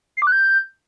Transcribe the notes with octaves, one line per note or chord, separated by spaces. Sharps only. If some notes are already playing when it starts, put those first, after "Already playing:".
C7
D6
F#6
G6